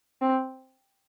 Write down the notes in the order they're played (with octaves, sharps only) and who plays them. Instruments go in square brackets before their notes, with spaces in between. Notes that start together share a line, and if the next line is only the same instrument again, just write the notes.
[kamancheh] C4